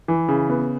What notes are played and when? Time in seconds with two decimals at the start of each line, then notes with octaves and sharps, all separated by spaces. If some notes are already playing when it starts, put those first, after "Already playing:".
0.08 E3
0.29 C#3
0.50 B3